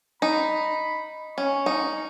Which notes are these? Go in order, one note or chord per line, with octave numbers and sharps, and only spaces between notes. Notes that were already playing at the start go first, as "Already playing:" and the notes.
D#4 B5
C#4 C#6
D#4